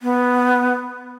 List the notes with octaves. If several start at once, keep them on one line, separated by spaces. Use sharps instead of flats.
B3